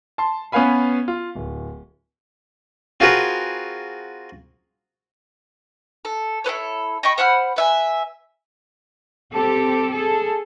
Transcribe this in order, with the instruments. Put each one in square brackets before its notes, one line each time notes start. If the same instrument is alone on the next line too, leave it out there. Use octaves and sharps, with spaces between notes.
[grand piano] A5 C6
B3 C#4 B4 F5 G#5 B5
F4
D1
[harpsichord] C4 F4 F#4 G#4 A#4 B4
[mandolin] A4
E4 A4 B4 C#5
D#5 G5 B5 C#6
C5 F#5 B5 F6
B4 E5 G#5
[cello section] C4 G4 A4
G#4 A4